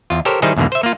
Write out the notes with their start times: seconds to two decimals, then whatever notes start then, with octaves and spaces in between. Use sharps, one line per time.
0.10 E2 F4
0.25 G4 A4 A#4 C5 C#5
0.42 D#3 G3 D#4 E4 G#4 C5
0.57 E2 G#2 B2 D3 A#3
0.72 C5 E5
0.83 A#3 F4